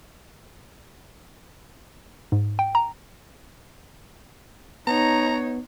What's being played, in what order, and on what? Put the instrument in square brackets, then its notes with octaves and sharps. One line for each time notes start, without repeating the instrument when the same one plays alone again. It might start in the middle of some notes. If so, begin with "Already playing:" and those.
[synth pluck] G#2
G5
A#5
[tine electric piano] B3 [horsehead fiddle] D#4 C#5 [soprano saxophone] A#5